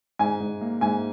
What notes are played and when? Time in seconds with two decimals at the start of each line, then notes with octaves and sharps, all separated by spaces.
0.19 G#2 G#5
0.40 G#2
0.61 A#3
0.81 G#2 G#5